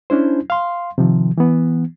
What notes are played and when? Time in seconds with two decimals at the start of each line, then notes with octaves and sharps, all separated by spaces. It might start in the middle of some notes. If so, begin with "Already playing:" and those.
0.10 C#4 D4 E4 C5
0.50 F5 C6
0.98 C3 D#3 F3
1.38 E3 B3